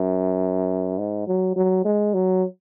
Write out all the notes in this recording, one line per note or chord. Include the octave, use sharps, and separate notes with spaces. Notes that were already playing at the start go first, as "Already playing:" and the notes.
Already playing: F#2
G#2
F#3
F#3
G#3
F#3